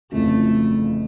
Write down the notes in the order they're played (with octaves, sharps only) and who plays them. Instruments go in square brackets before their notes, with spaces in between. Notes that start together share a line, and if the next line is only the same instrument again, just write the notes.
[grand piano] G1 F2 C#3 E3 [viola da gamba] A3